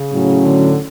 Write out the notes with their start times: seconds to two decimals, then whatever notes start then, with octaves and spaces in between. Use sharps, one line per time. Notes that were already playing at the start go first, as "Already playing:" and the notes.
Already playing: C#3
0.12 A2 F#3 C#4
0.45 D3